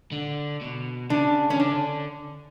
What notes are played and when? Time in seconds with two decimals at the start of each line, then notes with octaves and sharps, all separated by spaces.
0.12 D3
0.61 B2
1.10 C#3 D4
1.50 E3 C#4
1.60 D3 D4